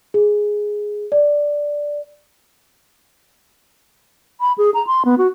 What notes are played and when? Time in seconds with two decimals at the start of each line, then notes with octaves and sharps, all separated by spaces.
0.14 G#4
1.12 D5
4.41 B5
4.58 G#4
4.74 A#5
4.87 C6
5.05 B3
5.18 F#4